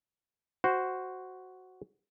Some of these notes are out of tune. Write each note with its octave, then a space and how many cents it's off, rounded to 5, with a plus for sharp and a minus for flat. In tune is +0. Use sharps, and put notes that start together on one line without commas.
F#4 +5 C5 +0